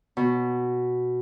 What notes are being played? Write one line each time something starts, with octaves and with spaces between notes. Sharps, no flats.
B2